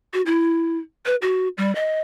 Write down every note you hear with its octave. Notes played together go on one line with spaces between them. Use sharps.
F#4
E4
B4
F#4
G3
D#5